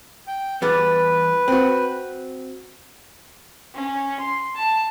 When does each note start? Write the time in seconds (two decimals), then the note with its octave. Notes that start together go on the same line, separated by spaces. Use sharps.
0.27 G5
0.62 E2 G3 B3 B4
1.48 C4 F#4
3.75 C#4
4.20 C6
4.55 A5